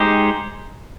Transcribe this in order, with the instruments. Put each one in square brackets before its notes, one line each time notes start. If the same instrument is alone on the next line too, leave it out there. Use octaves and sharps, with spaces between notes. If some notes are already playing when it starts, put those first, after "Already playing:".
Already playing: [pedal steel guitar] G#3 D#4 G4 C5